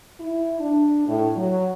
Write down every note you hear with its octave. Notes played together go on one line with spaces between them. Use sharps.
E4
D4
A2
F#3